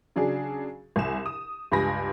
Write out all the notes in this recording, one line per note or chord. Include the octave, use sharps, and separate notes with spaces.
C#3 F#3 D4 G#4
C2 G#5 E7
D#6
C#2 G2 G4 G#5 B5 A#6